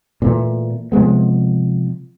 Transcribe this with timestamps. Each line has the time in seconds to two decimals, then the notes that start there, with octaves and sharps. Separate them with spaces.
0.22 A#2 E3 A3
0.92 C3 F3 G#3 B3